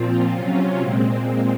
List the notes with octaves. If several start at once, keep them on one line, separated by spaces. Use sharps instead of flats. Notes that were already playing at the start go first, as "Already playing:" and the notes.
Already playing: A#2 F3 C4 F4
C3 F#3 C#4 F4
A#2 G#3 C4